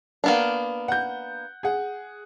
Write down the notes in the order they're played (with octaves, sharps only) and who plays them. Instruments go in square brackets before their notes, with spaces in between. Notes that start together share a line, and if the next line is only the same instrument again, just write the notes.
[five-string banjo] A#3 B3 D4
[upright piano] F#5 G6
G#4 F#5